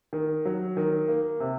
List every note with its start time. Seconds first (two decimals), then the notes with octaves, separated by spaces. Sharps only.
0.13 D#3
0.45 F#3
0.77 D#3
1.08 A#3
1.40 C3